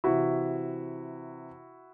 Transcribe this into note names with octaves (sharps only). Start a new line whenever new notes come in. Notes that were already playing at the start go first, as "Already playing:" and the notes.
C3 E3 E4 F#4